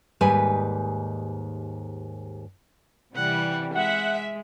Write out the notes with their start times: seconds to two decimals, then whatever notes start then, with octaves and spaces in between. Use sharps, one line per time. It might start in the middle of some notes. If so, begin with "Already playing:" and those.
0.21 D#2 G#2 G3 B4 G#5
3.15 C3 E3 G3 F#5
3.76 G#3 E5 F#5